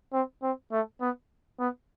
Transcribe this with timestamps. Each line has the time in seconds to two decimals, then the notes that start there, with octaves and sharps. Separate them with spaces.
0.13 C4
0.42 C4
0.72 A3
1.01 B3
1.60 B3